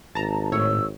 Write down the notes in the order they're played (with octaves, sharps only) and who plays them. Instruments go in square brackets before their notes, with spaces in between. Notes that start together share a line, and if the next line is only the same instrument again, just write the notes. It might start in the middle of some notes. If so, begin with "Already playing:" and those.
[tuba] G#1 [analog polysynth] A5 A#5
[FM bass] A2 [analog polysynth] C#5 [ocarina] E6